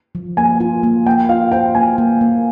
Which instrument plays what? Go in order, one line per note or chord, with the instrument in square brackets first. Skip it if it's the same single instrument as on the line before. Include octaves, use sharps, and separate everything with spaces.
[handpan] F3
[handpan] A#3 [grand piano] G#5
[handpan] F4
A#3
[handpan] A#3 [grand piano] G5
[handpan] F4 [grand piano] F5
[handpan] C5 [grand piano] G5
[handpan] A#3 [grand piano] G#5
[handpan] A#3
A#3